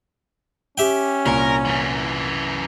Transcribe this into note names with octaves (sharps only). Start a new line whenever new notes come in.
C#4 G4 E5 G5
C2 A#2 A#4
F#2 E3